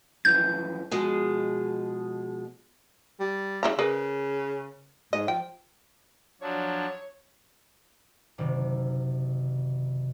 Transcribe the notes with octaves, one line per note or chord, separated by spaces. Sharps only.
F#2 E3 F3 G6
B2 F3 G#3 G#4
G3
C#3 E4 A#5
C#3 G#4 A#4 B4
G#2 D#5
F3 G5
F3 F#3 D4 C#5
F#1 C3 D#3